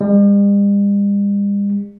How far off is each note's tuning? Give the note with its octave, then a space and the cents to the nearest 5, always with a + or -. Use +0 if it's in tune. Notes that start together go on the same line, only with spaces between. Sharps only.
G3 +45